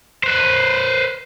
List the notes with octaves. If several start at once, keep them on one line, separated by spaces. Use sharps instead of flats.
B4 C5